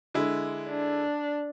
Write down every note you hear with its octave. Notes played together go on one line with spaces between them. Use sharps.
D3 G#3 E4
D4